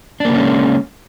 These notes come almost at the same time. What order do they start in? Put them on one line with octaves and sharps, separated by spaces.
D4 A#3 C#3 C#4 G#3